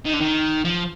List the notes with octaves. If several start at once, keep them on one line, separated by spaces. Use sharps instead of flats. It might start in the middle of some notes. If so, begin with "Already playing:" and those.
D#3
D3
D#3
F3